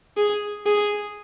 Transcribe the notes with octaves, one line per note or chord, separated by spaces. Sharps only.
G#4
G#4